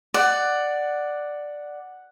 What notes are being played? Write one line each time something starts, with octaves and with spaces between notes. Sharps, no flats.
D5 F#5